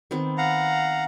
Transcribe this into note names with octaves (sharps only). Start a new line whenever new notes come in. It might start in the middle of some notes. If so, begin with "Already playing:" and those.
D#3 B3 C4
F5 F#5 A#5